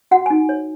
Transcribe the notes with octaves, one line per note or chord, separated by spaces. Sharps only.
F#4 F#5
D#4 G#5
C#5